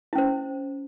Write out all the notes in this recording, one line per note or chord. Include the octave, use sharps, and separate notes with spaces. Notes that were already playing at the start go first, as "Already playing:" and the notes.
C#4 E4 C5